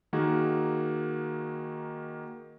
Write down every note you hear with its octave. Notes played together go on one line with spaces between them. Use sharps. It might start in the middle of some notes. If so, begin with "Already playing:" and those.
D#3 A#3 F#4 G#4